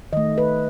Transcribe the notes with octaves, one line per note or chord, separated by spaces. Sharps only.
D#3 A3 D#5
B4